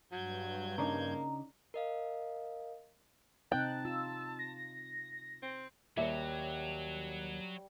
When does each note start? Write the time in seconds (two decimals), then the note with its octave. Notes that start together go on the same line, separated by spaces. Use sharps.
0.12 G2 F#3 G6 G#6
0.78 C#3 A#3 D4 D#4 A#5
1.74 A#4 D#5 F5
3.52 C3 C4 D#4 G5 A5 F#6
3.85 F4 E6
4.39 A#6
5.42 C4
5.97 D#2 F#3 G3 E5